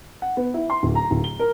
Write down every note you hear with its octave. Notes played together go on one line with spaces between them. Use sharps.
F#5
B3
E4
C6
D1
A#5
D1
G7
A#4